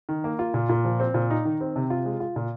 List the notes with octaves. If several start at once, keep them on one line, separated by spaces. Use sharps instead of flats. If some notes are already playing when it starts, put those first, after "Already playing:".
D#3
A#3
F4
A#2
A#2
F3
C4
A#2
D#4
D#3
C4
C3
F4
G#3
F4
A#2